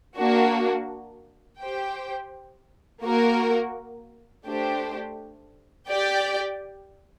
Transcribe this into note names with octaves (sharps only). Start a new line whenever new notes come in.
A#3 D4 F#4
G4 C5 G5
A#3 F#4 A#4
A3 D4 G4 C5
G4 D5 G5